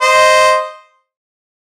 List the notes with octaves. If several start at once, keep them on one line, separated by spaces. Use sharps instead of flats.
C5 D#5